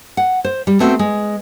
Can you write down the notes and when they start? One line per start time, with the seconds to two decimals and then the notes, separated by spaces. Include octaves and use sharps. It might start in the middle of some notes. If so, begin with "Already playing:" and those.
0.17 F#5
0.44 C5
0.67 G3
0.80 A3 B3 C4 F#4
0.99 G#3